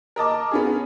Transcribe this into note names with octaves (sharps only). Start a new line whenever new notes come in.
A#4 D#5 A5 D6
B3 C#4 G#4